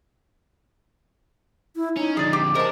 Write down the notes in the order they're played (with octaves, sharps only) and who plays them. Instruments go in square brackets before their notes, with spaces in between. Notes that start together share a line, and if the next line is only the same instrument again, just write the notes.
[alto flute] E4
[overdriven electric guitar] C#4 [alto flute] D#4
[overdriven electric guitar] F2 D3 [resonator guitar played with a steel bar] G#4 D5
[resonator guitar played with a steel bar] G4
[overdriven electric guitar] G#4 D#5 [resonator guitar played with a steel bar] A#4 A5 [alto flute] C5